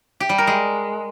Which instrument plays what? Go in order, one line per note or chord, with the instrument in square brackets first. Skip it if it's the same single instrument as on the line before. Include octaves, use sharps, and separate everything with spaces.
[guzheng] G4
G3
A#4
G#3